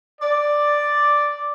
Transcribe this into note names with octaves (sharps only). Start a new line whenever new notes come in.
D5